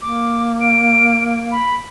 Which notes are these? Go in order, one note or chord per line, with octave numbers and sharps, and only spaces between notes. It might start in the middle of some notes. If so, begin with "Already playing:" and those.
A#3 D6
D7
B5